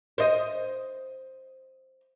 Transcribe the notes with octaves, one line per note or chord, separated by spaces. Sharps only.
C5 D#5